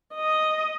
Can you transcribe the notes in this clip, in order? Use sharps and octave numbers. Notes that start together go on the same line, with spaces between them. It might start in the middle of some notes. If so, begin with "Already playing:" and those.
D#5